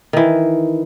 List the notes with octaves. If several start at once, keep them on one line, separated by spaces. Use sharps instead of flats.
D#3 E3